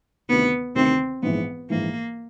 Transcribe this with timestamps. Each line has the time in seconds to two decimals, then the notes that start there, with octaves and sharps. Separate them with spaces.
0.29 D2 C3 D#3 B3
0.75 D2 C3 D#3 C4
1.23 A#1 G#2 E3 B3
1.70 A#1 G#2 E3 A#3